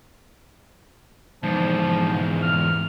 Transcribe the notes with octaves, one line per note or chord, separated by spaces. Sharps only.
E2 G#2 F3
F6